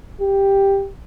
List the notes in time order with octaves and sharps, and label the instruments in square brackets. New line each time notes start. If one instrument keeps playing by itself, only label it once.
[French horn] G4